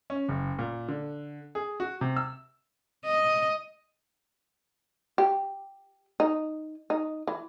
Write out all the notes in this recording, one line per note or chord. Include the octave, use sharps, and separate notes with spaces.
C#4
F#1
A#2
D3
G#4
F#4
C3
E6
D#5
G4
D#4
D#4
E3